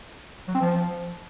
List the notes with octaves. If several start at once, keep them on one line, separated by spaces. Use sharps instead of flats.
F#3
C4
F3